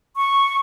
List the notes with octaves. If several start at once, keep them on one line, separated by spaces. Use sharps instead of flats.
C#6